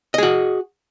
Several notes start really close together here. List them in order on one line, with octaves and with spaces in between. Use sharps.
D#5 G#4 F#4